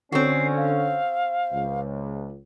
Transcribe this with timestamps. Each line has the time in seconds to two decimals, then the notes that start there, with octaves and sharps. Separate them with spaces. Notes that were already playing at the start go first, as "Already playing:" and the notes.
0.12 D3 C4 C#4 F#4 C7
0.57 F5
1.53 C#2